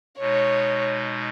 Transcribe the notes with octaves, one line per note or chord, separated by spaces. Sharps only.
B2 G#3 D#4 C#5